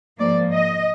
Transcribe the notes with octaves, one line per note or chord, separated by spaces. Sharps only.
G#2 F3 A#3 D5
D#5